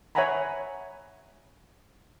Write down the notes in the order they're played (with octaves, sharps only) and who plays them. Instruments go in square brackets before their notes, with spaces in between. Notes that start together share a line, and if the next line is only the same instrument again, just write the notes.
[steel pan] C#5 E5 F#5 G#5 A#5 B5